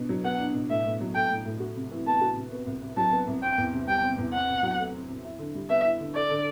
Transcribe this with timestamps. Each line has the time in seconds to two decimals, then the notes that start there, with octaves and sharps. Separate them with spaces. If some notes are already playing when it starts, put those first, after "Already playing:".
Already playing: B2 D4
0.09 F#3
0.25 B3 F#5
0.39 D4
0.54 B2
0.70 A2 E5
0.85 A2
1.01 F#3
1.15 A3 G5
1.30 A2
1.45 A2
1.60 F#4
1.76 C3
1.91 E3
2.07 B3 A5
2.21 F#4
2.36 C3
2.52 B3
2.67 C2
2.81 C3
2.97 F#3 A5
3.13 B3
3.28 C2
3.42 C4 G5
3.58 E2
3.73 C3
3.88 G3 G5
4.03 C4
4.18 E2
4.33 C4 F#5
4.49 C3
4.63 F#3
4.79 A3
4.94 C4
5.09 C3
5.25 E4
5.39 D3
5.55 G3
5.69 B3 E5
5.85 E4
6.00 D3
6.15 A4 D5
6.31 D3